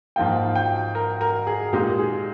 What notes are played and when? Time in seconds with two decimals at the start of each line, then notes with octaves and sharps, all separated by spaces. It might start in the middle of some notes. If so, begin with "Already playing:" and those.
0.16 G#2 F3 A#3 F4 G5
0.56 G5
0.95 A#4
1.21 A#4
1.47 G#4
1.73 A#2 G#3 D#4 G4
1.99 G#4